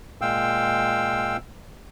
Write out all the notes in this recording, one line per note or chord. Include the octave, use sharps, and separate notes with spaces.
A#2 G#3 F5 G5 E6